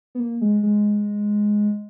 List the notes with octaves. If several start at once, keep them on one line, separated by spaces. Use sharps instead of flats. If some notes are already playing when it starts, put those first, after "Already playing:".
B3
A#3
G#3
G#3